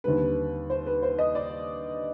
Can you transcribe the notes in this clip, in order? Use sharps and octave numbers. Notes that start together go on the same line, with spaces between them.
D#2 D3 G3 C4 B4
C5
B4
C5
D#5
D5